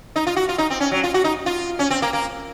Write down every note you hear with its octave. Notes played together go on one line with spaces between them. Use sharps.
D#4
F4
F#4
F4
D#4
C4
C#4
F#3
F4
F#4
D#4
F4
C#4
C4
A#3
A#3